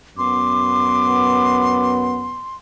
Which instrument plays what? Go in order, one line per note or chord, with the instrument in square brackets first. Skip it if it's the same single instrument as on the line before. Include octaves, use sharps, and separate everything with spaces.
[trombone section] F#2 B3 [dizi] C6 [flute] D6